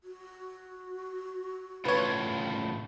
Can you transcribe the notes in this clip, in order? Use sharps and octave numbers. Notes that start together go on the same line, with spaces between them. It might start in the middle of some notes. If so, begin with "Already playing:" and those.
F#4
A2 C#3 F4 B4 C#5